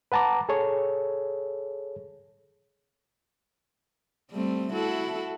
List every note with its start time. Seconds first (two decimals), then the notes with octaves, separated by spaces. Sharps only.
0.12 B4 F#5 A5 A#5 D6
0.49 G#4 A4 C#5
4.32 G3 A3 C4
4.73 E4 F#4 A4